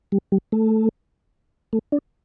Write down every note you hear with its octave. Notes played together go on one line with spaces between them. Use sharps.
G3
G3
A3
A3
D4